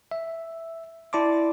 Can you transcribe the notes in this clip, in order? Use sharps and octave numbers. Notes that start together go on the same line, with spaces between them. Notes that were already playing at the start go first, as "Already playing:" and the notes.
E5
E4 D5 A5 C6 D6